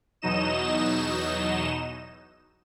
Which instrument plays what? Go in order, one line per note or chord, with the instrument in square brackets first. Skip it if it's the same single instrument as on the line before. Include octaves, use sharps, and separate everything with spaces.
[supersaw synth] E2 B2 F#3 D#4 D#5 E7